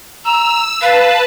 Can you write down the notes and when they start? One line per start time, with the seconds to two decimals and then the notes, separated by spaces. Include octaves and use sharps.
0.25 A#5 E6
0.82 B4 F5 A5